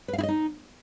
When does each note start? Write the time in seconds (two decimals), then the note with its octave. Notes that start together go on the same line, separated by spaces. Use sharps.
0.08 B4
0.13 F5
0.18 E4
0.23 D#5
0.28 D#4